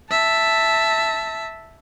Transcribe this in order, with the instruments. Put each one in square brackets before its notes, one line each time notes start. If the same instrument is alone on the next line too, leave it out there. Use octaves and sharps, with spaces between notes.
[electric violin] E5 A5